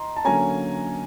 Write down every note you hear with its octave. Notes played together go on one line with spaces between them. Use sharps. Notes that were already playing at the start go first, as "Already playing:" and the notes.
Already playing: D#5 A#5 C6
A5
D3 F#3 A#3 C#4 G#5 A#5